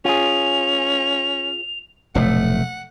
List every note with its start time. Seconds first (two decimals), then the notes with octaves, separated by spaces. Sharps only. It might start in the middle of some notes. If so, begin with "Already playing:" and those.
0.05 C#4 F4 G#4 F7
2.15 F1 B1 A2 A3 F#5